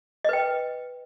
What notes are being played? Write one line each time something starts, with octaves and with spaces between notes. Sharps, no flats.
B4 D#5 G5